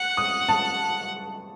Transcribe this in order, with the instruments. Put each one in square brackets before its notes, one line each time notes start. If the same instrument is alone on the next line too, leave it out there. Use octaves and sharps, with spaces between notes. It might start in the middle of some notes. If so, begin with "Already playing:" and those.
Already playing: [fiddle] F#5 [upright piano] F#6
[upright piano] D#6
A5